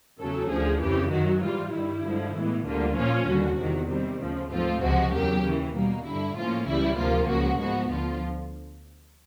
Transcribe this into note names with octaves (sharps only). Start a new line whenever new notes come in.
E2 C#3 F#3 A3 C#4 A4
D2 D3 F3 G#4
F2 C#3 E3 G4
F#2 D#3 F#3 F#4
G#2 E3 G3 F4
G2 D#3 G3 E4
G2 D3 F3 G#3
A2 E3 G#3 B3
D2 D3 G3 A#3 F4
A#2 F3 A#3 C#4 F4
D#2 D3 G3 F#4
E2 C3 D#3 F#4
C3 D#3 G3 C4
D2 C#3 F3
G#2 F3 A3 C4 F4
C#2 C3 F3 G#3 F#4
E2 C#3 F#3 A#3 G4
D#2 C#3 E3
B2 G3 A#3
G2 D3 G3 E4
A2 F3 A#3 C#4 F4
C#2 C#3 E3 G3 E4
D2 C3 F3 A#3 F4
C#2 C#3 F3 F#4
G#2 F3 G#3 B3 F#4
D2 D3 F3 F4